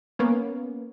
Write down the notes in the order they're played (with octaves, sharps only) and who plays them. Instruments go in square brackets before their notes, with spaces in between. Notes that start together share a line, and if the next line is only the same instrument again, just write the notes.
[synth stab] A#3 B3 C#4